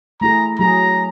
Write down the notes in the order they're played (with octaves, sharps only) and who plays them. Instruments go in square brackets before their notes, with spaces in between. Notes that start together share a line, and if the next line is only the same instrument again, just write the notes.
[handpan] A3 E4 G#4 [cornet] A#5
[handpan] F#3 G#4 [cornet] A#5